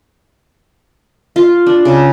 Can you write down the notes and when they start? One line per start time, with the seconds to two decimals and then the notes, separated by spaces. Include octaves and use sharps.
1.36 F4
1.66 D4
1.85 C#3